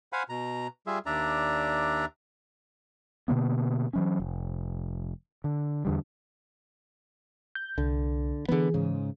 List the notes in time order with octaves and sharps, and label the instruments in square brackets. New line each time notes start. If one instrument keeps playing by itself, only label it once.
[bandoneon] C5 F5 F#5 G#5 B5
B2 A#5
G3 F4 G#4 E5
D#2 D4 D5 E5 A#5
[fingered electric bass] B2 D3 A#3 B3
E3 F#3 C#4
F1
D3
E2 D3 G3
[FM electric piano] G6
[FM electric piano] C2 [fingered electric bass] D3
[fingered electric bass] D3 B3 [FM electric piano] E3 G#4
[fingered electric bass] G#2 C#3